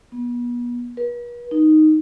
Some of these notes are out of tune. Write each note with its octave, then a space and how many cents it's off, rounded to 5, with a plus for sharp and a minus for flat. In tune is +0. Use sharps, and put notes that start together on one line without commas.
B3 -35
B4 -45
D#4 -5